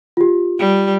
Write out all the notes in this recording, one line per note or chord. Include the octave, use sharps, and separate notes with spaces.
F4 G4
G3